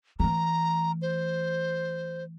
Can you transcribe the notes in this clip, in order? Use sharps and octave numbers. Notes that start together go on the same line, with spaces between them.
E3 A3 A#5
C5